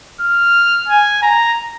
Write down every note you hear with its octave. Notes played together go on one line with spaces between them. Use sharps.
F6
G#5
A#5